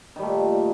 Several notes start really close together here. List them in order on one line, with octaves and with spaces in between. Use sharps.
D#3 G3 A3 A#2